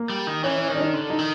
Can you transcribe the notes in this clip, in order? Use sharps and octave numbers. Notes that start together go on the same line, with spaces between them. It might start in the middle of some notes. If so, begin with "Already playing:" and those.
Already playing: A#3
G3
D#3
E3 C#4
C#4
D#3 C#4
D4
D#4
D3
D#4
D#3